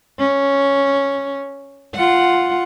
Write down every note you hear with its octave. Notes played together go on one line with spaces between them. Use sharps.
C#4
F4 F#5